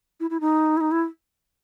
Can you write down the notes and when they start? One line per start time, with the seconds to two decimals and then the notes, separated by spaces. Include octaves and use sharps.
0.20 E4
0.30 E4
0.41 D#4
0.77 E4
0.81 D#4
0.91 E4